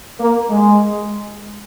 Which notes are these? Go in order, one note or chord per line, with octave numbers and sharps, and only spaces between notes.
A#3
G#3